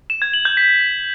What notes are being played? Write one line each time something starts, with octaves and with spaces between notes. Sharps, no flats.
E7
G#6
F#7
G6
B6